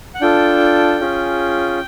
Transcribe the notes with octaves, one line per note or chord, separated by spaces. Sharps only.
F#5
D4 F4 A4 G5
C#4 F4 G#4